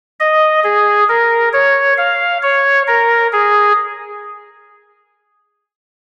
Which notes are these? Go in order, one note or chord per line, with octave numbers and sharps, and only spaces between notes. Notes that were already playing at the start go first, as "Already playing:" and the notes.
D#5
G#4
A#4
C#5
F5
C#5
A#4
G#4